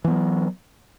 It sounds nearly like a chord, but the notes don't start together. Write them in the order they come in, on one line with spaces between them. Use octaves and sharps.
E3 B3 F#3